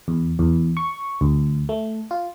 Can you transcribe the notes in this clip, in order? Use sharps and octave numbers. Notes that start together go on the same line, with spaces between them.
E2
E2
C#6
D2
A3
F4